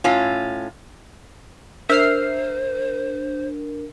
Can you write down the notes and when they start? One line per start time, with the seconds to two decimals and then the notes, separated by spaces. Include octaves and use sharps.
0.04 A2 C#4 F4
1.90 D4 A#4 C5 E5 F6 C7